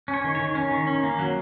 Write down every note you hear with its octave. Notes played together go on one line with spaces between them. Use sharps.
C#4
C#5
D#3
D#3 C#5
C#4
D#3
C#4
A#3
F#3